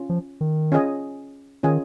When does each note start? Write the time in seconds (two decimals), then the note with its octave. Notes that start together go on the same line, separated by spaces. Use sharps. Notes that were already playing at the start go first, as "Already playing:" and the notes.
Already playing: C#4 F4
0.09 F3
0.41 D#3
0.72 C#4 F4 G#4 D#5 G#5
1.63 D#3 C#4 F4 G#4 D#5 G#5